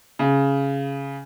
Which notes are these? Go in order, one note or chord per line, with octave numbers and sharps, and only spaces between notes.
C#3